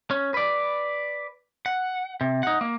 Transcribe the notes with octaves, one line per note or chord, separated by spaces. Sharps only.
C#4
B4 D5
F#5
C3
D#4 F#5
A#3